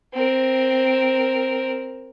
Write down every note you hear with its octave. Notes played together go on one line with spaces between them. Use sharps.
C4 A#4